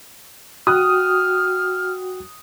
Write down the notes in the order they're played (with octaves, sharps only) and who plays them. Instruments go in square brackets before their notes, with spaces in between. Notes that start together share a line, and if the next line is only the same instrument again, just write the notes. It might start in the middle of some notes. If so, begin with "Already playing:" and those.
[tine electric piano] F#4 G5 [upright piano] D#6 F#6 [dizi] F6